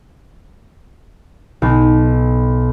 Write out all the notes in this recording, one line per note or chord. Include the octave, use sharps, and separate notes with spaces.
B1